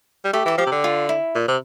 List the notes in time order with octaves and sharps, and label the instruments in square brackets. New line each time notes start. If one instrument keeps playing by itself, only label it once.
[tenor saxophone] G3
[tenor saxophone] A3 [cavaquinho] G4
[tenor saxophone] E3 [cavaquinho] A4
[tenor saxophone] F3 [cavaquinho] G4
[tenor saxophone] C3
D3
[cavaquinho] F4
E4
[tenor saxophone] A#2
C3